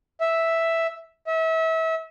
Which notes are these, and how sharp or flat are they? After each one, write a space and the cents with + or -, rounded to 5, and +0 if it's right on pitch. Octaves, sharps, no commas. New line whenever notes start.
E5 +0
E5 -30